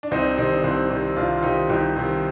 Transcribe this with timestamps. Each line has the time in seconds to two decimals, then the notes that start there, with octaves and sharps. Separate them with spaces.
0.03 D4
0.11 C2 C4 D#4
0.24 D4
0.38 C3 D#3 C4 D#4
0.52 D4
0.64 C2 C4
0.90 C3 D#3 D4
1.16 C2 D4 F4
1.37 F4
1.43 C3 D#3 D#4 G4
1.69 C2 D#4 G4
1.96 C3 D#3